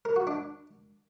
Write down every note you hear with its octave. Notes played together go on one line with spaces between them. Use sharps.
A#4
F#4
D4